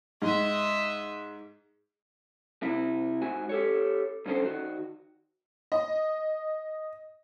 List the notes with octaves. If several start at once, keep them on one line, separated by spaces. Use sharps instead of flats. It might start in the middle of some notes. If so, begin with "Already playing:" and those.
G#2 D#5 E5
C3 E4
G#2 F#4 G#5
G4 A4 C#5
G2 D3 C#4 A4 C5
D#3 F#4
D#5